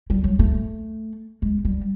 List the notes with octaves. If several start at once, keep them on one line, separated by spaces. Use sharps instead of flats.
G3
F#3
A3
G#3
G3